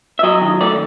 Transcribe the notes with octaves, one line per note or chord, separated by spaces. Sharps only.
E5
F#3 D#5
D#3
A3 D5